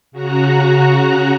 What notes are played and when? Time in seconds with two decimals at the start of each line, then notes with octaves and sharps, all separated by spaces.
0.12 C#3 F#4 A#5 F#6